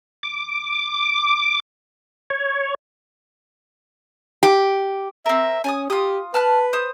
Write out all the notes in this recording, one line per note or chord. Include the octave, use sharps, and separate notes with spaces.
D6
C#5
G4
C4 A#4 E5
C#4 G#5 A5 D#6
F4 G4 D#6
B4 A5 F6 F#6
C5 D#6